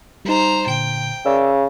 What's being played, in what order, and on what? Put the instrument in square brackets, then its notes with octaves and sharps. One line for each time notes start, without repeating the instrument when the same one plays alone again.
[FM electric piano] G3 D#4 [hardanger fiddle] C5 A#5
[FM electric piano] A#2 D3 [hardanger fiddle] G5
[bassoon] C#3 [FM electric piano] A#4 D5 E6